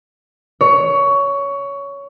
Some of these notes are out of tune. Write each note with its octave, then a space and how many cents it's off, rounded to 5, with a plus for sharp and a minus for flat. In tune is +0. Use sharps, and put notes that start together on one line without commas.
C#5 +15